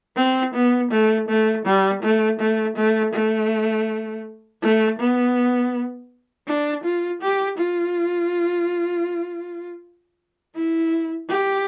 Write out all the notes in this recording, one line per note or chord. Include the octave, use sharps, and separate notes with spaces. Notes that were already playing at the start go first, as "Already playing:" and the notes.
C4
B3
A3
A3
G3
A3
A3
A3
A3
A3
B3
D4
F4
G4
F4
E4
G4